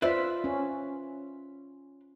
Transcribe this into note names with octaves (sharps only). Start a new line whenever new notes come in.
F4 B4 C5 D5 E5
C#4